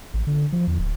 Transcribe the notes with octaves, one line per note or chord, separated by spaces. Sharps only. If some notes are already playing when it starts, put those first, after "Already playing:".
A1
D3
F3
E2
D1